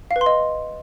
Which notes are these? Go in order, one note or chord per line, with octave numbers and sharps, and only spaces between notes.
F5
B4
C6
D#5